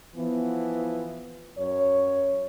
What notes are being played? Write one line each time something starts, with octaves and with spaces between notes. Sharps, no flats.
E3 F3 B3
F#2 C#5